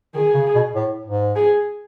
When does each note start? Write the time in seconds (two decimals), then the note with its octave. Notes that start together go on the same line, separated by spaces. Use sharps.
0.15 D#3 G#4
0.34 C#3
0.55 B2
0.76 A2
1.06 G#2
1.36 G#4